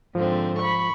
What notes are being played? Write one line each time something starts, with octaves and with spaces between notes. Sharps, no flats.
G#2 D3 F3 C4
B5 C#6